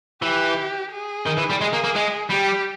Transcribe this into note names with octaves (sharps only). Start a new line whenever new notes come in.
E3 G4
G#4
D#3
E3
G3
G#3 G#4
A#3
A#3
G#3
G3 G4